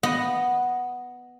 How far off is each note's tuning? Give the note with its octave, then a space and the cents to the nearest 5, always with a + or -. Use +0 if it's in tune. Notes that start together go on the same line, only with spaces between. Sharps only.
B3 +0 D#5 +0